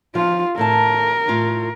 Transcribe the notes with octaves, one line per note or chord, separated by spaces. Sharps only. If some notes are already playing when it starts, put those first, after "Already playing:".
F3 F4
A2 A4 A#4 A5
A2 F4